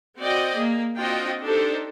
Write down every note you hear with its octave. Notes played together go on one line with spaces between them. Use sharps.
C4 F#4 D5 D#5 G5
A#3 G#4
C4 D4 F4 F#4 D#5 G5
D4 D#4 G4 A4 C5